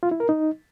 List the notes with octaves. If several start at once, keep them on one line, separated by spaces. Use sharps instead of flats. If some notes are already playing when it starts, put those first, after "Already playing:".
F4
E4
A#4
D#4